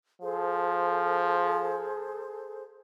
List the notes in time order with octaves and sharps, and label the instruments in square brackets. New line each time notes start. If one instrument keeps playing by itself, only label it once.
[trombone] F3 [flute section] G#4 A4 C5